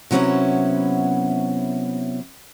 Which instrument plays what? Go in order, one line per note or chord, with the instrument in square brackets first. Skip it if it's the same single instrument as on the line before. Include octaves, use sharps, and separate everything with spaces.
[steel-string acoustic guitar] C3 F#3 B3 C#4 E4 C#5